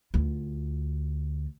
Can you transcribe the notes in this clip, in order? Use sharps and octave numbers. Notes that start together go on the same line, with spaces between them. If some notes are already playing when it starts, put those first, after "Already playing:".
D2 F4